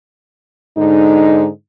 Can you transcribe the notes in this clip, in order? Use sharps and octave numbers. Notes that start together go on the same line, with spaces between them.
G#2 D3 D#4